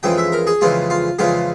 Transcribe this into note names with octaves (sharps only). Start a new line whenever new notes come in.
F2 C#3 E3 G#3 G5
E5
A#4
G#4
F2 C#3 E3 G#3 F4
F4
F2 C#3 E3 G#3 F4